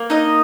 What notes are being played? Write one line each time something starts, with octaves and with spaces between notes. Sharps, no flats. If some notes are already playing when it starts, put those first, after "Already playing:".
Already playing: A#3
D#4 D#5